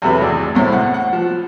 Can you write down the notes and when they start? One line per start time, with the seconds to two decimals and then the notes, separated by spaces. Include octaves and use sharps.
0.02 E2 C3 F#3 A3 B4 B5
0.20 G#1 E2 D5
0.55 C2 A2 E4 C5
0.72 F#5
0.94 F#5
1.13 F3